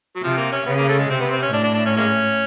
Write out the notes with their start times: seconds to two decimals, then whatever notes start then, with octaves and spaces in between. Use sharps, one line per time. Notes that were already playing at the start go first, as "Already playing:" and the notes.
0.16 F#3
0.23 C3 F3
0.37 A#3
0.52 C#4
0.66 C#3 B3
0.78 A#3
0.88 A3
0.99 G#3
1.10 C3 C4
1.21 B3
1.31 C4
1.42 C#4
1.53 A2 D4
1.63 D4
1.74 D4
1.86 C#4
1.97 G#3 A#3 C#4